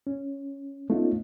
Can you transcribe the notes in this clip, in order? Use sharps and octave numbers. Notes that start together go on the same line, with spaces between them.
C#4
A3 B3 C#4 D#4 F4